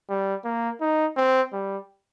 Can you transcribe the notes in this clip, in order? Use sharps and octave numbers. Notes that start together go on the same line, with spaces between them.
G3
A#3
D#4
C4
G3